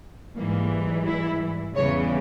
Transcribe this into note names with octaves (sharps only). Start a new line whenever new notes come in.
G#2 E3 G3 A#3
E4
E2 C#3 E3 G3 C#5